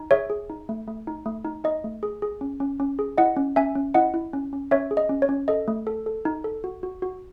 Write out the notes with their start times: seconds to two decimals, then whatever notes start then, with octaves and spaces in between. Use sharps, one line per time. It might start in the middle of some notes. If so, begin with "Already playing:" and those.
Already playing: D#4
0.11 G#4 C#5 E5
0.30 G#4
0.50 D#4
0.69 A3
0.88 A3
1.07 D#4
1.26 A3
1.45 D#4
1.64 D#4 D#5
1.84 A3
2.03 G#4
2.22 G#4
2.41 C#4
2.60 C#4
2.80 C#4
2.99 G#4
3.18 E4 D#5 F#5
3.37 C#4
3.56 C#4 E5 G#5
3.75 C#4
3.94 E4 D#5 F#5
4.14 E4
4.33 C#4
4.53 C#4
4.71 C#4 C#5 E5
4.91 G#4
4.97 D#5
5.09 C#4
5.22 C#5
5.29 C#4
5.48 A4 D#5
5.68 A3
5.87 A4
6.06 A4
6.25 D#4
6.44 A4
6.64 F#4
6.83 F#4
7.02 F#4